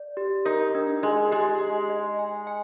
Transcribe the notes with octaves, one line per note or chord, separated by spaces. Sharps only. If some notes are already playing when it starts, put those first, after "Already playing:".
Already playing: D5
G4
D#4 A#4
D4
G#3 D#5
G#3 G4
D#5
D#5
G#5
G#5